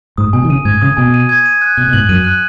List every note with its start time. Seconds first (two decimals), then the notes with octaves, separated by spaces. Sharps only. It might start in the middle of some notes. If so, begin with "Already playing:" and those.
0.18 G#2 D#6
0.33 B2 G#5
0.45 D#3
0.50 C#3 D#7
0.65 G#2 G#6
0.82 C#3 D#6
0.97 B2 G#5
1.14 D#7
1.29 G#6
1.46 D#7
1.62 F#6
1.76 B2 F#6
1.88 B2
1.93 G#2 F#7
2.09 F#2 D#7
2.24 F#6